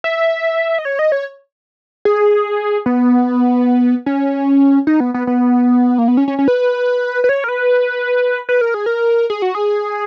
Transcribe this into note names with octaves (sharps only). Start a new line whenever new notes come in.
E5
D#5
C#5
D#5
C#5
G#4
B3
C#4
D#4
B3
B3
B3
A#3
B3
C#4
C#4
C#4
B4
B4
C#5
A#4
B4
B4
A#4
G#4
A#4
G#4
F#4
G#4